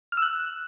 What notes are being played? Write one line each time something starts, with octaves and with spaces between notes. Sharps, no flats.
F6
E6
F#6